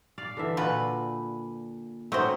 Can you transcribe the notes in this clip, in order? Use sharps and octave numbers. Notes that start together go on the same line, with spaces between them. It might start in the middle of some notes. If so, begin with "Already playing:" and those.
D5 F5
D3 E3 E5
A#2 F4 F#4 B4
A3 C4 C#4 D#4 F#4 C5